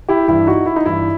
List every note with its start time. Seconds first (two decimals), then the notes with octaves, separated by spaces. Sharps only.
0.09 E4 G4
0.28 G2 E3 E4
0.47 D#4 F#4
0.66 E4
0.76 D#4
0.86 G2 E3 E4